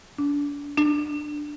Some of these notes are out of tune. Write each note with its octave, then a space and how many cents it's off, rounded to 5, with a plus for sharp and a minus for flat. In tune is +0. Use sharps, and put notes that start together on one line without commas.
D4 -30
D4 +10